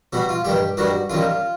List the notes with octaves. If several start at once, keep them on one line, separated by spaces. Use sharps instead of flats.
B2 G3 F#4
F4
G2 D#3 G3 G4
G2 D#3 G3 F#4
F#2 D#3 G3 F4